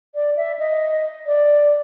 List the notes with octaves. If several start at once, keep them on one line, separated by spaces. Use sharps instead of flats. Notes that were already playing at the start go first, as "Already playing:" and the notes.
D5
E5
D#5
D5